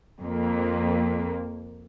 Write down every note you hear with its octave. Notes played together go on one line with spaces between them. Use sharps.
F2 A#3